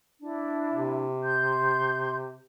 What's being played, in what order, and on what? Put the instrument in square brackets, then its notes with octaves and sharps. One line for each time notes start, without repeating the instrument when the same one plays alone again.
[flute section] D4 E4
[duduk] C3
[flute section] C6 G6